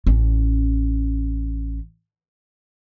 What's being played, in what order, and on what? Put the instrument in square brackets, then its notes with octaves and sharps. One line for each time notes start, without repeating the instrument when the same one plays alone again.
[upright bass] A1 C#4